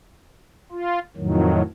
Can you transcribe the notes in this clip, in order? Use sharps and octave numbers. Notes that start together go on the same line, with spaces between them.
F4
F2 A2 D#3 F#3